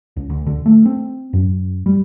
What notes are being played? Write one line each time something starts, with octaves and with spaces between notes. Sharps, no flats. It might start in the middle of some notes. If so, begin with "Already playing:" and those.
C#2
D2
D3
A3
C4
F#2
G3